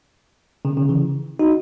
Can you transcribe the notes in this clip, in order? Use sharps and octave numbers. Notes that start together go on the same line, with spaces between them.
C#3
C#3
C#3 E3
D#4 F#4